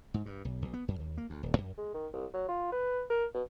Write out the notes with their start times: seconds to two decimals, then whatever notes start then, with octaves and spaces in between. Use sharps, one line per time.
0.14 G#2
0.26 G2
0.45 B1
0.62 B1
0.74 B3
0.88 F#2
1.00 D#2
1.18 A#3
1.30 D2
1.43 D#1
1.58 F#2
1.77 G#3
1.94 D#3
2.13 C2
2.34 F#3
2.49 F4
2.72 B4
3.10 A#4
3.34 B2